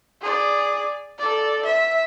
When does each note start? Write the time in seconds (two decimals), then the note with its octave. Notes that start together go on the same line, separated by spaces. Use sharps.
0.21 G#4 D5
1.18 A4 D5
1.63 E5